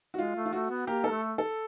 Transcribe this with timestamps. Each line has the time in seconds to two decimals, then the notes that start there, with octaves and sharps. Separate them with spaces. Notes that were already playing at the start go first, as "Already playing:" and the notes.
0.14 F#4
0.18 G#3 F4
0.36 A3
0.45 F4
0.53 A3 F#4
0.70 B3
0.87 A#3 G4
1.04 A#3 A4
1.10 A3
1.38 A4